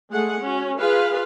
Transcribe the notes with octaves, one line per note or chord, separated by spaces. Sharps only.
G#3 A3 G#4 F#5
C#4 F#4
F4 G#4 B4 F5